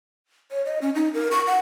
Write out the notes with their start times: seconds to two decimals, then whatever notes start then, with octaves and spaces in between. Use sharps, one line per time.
0.51 C#5
0.65 D#5
0.82 C#4
0.95 D#4
1.14 A#4
1.31 C#6
1.47 F#5